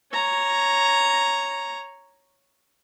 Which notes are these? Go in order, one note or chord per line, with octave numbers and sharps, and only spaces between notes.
C#5 A#5